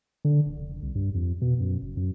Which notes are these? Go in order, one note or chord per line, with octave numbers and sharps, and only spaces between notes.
D3
D#1
F1
C2
G2
F2
B2
F#2
F#1
F#2